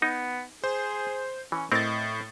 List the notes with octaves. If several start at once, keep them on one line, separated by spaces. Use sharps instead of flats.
B3 D#4
G#4 C5
E3 C#4
A2 C4 A#4 D#5 A6